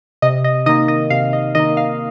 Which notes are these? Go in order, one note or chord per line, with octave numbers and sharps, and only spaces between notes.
C3 D#5
D#5
D#3 A#3 D#5
D#5
C3 F5
D#5
D#3 A#3 D#5
F5